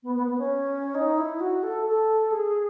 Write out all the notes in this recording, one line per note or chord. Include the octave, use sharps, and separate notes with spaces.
B3
B3
B3
C#4
D#4
E4
F#4
A4
A4
G#4